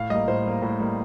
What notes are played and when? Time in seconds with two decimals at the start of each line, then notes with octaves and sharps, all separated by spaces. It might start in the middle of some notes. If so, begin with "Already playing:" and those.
Already playing: A2 F5
0.10 G3 A#3 D#5
0.28 A2 C5
0.45 G3 A#3
0.62 A2
0.80 G3 A#3